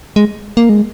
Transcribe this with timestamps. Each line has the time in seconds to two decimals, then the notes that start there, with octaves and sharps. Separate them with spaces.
0.16 G#3
0.57 A#3
0.69 G#3